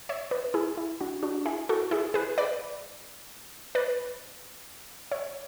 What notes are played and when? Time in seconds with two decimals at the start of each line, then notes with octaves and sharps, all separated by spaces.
0.09 C#5 E5
0.31 B4 D5
0.54 E4 G#4
0.77 E4
1.01 D4 F#4
1.23 D4 F#4
1.46 E4 G#4
1.69 F#4 A4
1.91 E4 G#4
2.14 G#4 B4
2.38 B4 D5
3.75 B4 D5
5.12 C#5 E5